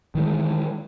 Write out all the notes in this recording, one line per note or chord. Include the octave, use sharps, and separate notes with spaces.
D#3 E3 G#3